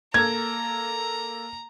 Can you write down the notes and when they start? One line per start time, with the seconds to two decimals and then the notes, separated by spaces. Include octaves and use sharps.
0.14 A#3 A4 A#5 G#6